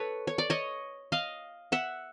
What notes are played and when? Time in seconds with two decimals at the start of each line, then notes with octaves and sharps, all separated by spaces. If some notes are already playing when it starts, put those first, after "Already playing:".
Already playing: A4 B4 C#5
0.27 C#5
0.38 D5
0.50 C#5 D#5
1.12 D#5 F5
1.72 E5 F#5